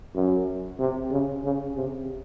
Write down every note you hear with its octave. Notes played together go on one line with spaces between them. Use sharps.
F#2
C3
C#3
C#3
C3